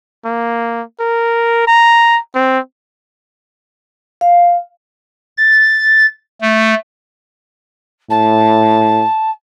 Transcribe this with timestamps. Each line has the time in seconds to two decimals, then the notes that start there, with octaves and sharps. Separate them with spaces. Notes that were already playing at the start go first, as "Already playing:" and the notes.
0.25 A#3
1.00 A#4
1.67 A#5
2.35 C4
4.21 F5
5.37 A6
6.41 A3
8.10 A2 A5